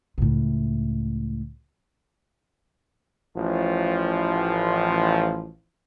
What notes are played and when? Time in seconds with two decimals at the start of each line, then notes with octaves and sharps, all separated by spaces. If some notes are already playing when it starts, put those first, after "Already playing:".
0.18 C#2 A2
3.37 A1 F3